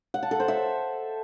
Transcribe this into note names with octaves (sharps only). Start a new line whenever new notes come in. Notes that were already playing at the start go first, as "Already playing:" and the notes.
F#5
A5
A4
C5
E5